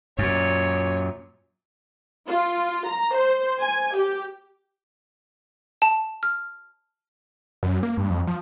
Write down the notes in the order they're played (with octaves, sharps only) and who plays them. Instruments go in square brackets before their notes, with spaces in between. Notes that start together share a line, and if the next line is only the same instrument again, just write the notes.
[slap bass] F#2 A#2 [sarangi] C#5
[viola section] F4
A#5
C5
G#5
G4
[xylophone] A5
F6
[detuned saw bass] F#2
A#3
G2
F2
F3